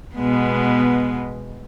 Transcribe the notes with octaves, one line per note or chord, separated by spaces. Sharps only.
B2 G#3 B3